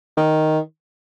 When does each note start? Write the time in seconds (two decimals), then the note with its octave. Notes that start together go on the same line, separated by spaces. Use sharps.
0.17 D#3